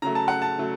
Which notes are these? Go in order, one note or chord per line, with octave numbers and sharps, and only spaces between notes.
C#3 F#3 A3 A#5
A5
F#5
A5
C#3 F#3 A3